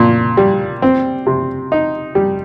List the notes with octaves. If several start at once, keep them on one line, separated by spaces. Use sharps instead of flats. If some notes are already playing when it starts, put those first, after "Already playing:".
Already playing: A#2
G3
C4
C3
D#4
G3